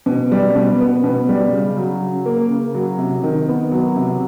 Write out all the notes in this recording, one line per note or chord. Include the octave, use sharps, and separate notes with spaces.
B2
G3
B2
B3
B2
G3
C#3
F#3
C#3
A#3
C#3
F#3
C3
D#3
B3
F#3
C3